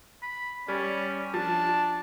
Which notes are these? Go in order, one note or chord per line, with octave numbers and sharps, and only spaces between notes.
B5
G3 C#4 D5
F3 D4 A5